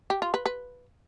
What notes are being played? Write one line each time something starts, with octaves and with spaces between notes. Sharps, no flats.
G4
F4
B4
B4